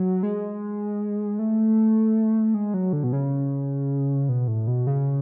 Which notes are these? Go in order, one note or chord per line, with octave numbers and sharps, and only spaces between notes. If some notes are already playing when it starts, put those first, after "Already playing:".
Already playing: F#3
G#3
A3
G#3
F#3
D3
B2
C#3
B2
A2
B2
C#3